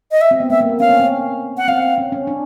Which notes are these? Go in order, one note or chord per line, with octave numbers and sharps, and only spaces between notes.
D#5
E5
C4
B3
A3 E5
A#3
B3
C#4 F5
C4
C#4
F#5
C4 F5
C#4
C#4
D4